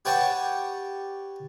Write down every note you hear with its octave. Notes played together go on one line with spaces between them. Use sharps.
G4 B4 C#5 F#5 G5 A5